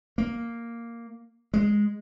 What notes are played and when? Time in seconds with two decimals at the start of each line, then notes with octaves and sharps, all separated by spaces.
0.18 A#3
1.54 G#3